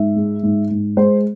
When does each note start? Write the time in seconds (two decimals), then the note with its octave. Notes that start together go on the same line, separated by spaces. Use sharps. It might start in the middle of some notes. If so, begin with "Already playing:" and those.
Already playing: G#2 E5
0.16 G#3
0.43 G#2
0.71 G#2
0.97 G#3 C5